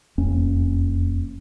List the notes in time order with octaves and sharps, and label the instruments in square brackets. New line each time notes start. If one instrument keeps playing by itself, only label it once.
[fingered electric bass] E1 F2 A#3 C#4